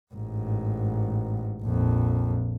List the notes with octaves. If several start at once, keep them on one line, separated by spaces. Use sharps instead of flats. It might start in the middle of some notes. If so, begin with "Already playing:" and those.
A1 G#2
A#1 F2